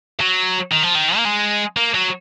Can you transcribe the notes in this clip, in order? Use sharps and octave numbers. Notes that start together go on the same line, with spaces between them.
F#3
D#3
F3
D#3
A#3
G#3
A#3
F#3